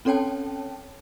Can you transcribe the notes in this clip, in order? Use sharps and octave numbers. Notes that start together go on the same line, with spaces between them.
C4 C#4 A4 C#5 G5 A5